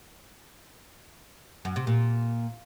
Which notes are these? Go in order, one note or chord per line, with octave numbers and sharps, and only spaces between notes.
F#2
C3
A#2